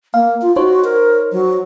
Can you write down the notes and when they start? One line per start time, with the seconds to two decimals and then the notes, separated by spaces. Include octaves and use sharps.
0.14 A#3 F5
0.42 F4
0.56 D#4 F#4 C5 C#5
0.84 A#4
1.32 F#3